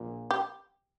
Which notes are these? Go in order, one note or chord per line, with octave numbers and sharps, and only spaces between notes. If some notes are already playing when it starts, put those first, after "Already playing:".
Already playing: A#1 A#2
G4